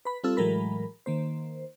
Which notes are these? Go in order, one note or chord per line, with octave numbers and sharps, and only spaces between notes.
B4 B5
G3 C4 F4 A4 E6
A2 E3 F#3 G#3 A#4 B5
D#3 A#3 C5